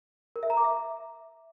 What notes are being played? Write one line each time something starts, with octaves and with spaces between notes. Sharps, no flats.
A#4
E5
A#5
D6
E5